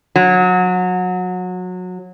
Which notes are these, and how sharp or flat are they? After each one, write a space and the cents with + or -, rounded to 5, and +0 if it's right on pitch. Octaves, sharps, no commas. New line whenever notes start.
F#3 -25